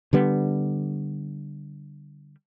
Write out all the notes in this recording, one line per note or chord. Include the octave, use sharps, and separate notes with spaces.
D3 G3 B3